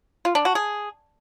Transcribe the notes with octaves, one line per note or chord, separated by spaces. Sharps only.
F4
D4
F#4
G#4